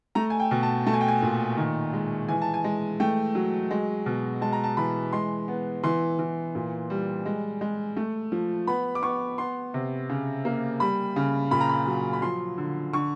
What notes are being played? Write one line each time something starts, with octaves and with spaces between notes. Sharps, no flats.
A3 A#5
G#5
G5
B2
A5
A3 A5
G#5
G5
G#5
A#2
D#3
G#3
E3 G#5
A5
G#5
G#3
A3 G5
F#3
G#3
B2
G#3 A5
A#5
A5
E3 B5
G#3 C6
B3
E3 C6
E3
A#2
G3
G#3
G#3
A3
F3
B3 B5
D6
B3 C#6
B3 C6
C3
C#3
A#3
G3 B5
C#3
A#2 B5
A#5
B5
F#3
B5
F3 C6
D3
D3 C#6